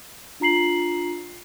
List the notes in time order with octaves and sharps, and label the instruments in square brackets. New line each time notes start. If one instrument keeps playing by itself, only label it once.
[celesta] D4 F4 A#5 C7 F#7